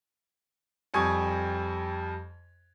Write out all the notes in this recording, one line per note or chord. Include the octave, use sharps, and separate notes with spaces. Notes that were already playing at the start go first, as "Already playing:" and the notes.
F2 G3 G#5 C#6 D#6 G#6